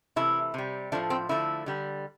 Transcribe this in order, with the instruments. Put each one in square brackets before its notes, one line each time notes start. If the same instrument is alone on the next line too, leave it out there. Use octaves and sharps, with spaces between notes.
[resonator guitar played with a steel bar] C3 E3 A3 E4
C3 G3
A2 F3 A3 D4
C4
D3 F3 A3 E4
D3 G3